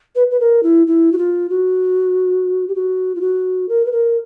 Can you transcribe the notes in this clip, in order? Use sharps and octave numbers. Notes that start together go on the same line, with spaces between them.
B4
B4
A#4
E4
E4
F#4
F4
F#4
G4
F#4
F4
F#4
A#4
B4
A#4